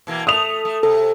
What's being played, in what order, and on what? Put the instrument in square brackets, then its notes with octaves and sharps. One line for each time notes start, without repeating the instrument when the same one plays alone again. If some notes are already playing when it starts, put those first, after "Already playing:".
[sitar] B2 E3 A#3
[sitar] A3 [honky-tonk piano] D#6 F7
[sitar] A3
[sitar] C3 [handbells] A4